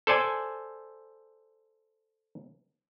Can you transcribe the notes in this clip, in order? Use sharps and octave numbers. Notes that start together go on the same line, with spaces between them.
A4 C5 D5 G#5